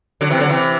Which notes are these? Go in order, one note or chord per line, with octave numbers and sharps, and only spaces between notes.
D3 F#3
C3 E3
D3 F#3
C3 E3